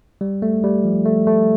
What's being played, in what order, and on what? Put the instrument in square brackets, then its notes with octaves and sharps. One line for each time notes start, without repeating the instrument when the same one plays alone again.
[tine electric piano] G3
A3
G3
F3
A3
A3